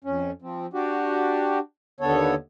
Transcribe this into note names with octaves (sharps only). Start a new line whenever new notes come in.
F2 C#4
F3 C4
D4 F#4 G4
D#2 D3 B3 A4 C#5